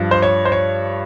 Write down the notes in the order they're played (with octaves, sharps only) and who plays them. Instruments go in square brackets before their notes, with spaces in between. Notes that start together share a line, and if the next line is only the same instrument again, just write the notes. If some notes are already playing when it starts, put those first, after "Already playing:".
Already playing: [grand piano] G2 F3
C5
C#5
C5
C#5